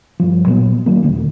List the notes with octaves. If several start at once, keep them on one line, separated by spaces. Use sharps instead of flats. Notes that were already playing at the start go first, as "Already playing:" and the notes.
G2 F3
A#2 F#3 G#3 B3
D#3 F#3 A#3
D#1 C#2 D3 A3